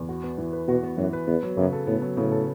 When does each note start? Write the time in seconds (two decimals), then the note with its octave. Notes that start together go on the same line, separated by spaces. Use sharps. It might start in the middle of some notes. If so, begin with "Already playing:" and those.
Already playing: E2
0.09 F#4
0.24 B3
0.38 E3
0.53 B4
0.68 B2 F#4
0.83 B3
0.97 F#2 E3
1.13 B4
1.27 E2 B3
1.43 F#3
1.57 F#2 C#3
1.73 A4
1.87 A2 B3
2.02 F#3
2.17 A2 C#3
2.32 A4